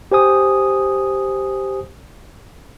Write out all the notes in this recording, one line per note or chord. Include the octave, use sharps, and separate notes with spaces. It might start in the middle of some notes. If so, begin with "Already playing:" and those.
G4 C5 G#5 D#6